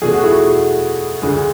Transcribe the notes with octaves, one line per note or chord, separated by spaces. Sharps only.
E2 B2 A3 G#4
F#4
E4 G#4
D2 D3 G#3